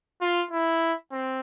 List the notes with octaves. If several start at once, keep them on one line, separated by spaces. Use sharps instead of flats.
F4
E4
C4